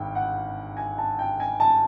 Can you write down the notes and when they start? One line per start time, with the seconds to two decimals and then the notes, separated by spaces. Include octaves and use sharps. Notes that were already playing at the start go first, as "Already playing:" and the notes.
Already playing: G#1 G2 G5
0.15 F#5
0.77 G#5
0.98 A5
1.19 G5
1.40 G#5
1.60 A5